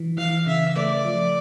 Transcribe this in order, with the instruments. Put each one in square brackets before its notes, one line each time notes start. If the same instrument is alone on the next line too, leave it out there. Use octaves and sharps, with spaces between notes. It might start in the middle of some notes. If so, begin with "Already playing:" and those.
Already playing: [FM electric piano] E3
[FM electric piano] E3 [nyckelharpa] F5
[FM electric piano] C#3 [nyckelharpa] E5
[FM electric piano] A3 [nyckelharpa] D5
[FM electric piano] F3